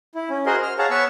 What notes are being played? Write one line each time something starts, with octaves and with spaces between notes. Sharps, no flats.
E4
C#4
F#4 G#4 A#4 C5 D#5 C6
F6
G#4 C#5 F5 F#5 A5 A#5
B3 B4 C#5 C#6 E6